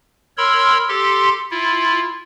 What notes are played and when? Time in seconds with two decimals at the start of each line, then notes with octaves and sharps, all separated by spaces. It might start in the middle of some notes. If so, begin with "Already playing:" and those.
0.37 A#4 C#5 B5 C6 E6
0.89 G4 A4 C6
1.51 E4 F4